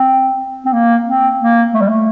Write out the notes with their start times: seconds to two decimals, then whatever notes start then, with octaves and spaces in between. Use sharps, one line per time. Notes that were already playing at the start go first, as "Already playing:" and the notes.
Already playing: C4
0.66 C4
0.73 A#3
1.06 C4
1.41 A#3
1.74 A3
1.81 G3
1.88 A3